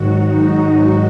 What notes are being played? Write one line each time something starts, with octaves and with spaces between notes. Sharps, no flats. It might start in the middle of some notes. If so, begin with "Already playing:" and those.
Already playing: G#2 D#3 F#3 F#4
D#4